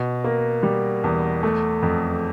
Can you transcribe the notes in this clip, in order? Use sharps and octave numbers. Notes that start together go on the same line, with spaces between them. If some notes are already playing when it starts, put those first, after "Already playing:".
Already playing: B2
A#3
G3
E2
A3
F2